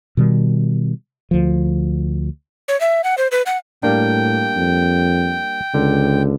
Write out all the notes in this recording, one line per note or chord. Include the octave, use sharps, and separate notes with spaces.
B2 D#3 G3
D2 F3
C#5
E5
F#5
C5
B4
F#5
A2 G3 A#3 D4 G5
F2
C#2 D3